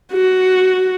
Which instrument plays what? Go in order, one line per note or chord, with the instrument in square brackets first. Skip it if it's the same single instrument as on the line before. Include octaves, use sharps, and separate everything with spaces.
[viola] F#4